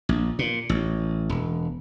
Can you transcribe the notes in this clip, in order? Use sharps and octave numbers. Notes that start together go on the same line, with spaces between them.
A#1
A#2
A1
E1